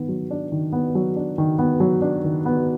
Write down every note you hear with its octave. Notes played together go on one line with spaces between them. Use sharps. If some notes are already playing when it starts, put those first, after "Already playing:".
Already playing: D#3 B3
F#3
D4
D#3
B3
F#3
D4
D#3
B3
F#3
D4
D#3
B3